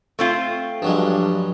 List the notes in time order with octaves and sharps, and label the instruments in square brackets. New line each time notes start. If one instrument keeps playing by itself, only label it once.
[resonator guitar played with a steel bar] A3 C4 F4
[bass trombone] G2 [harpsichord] F3 F#3 G#3